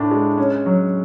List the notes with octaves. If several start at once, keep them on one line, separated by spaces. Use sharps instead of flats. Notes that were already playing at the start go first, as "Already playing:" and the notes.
Already playing: A2 D4
G#3
C#4
F#3